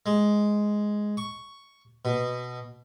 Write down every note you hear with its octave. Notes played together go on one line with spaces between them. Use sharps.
G#3
C#6
B2